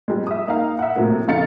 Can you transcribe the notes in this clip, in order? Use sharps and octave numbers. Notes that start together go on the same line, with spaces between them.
F3 G3 G#3
E5 D#6
A#3 D#4 F5
E5 F#5
A2 C3 F3 F#3 A#3
F1 C#3 D#4 F5 A6 C#7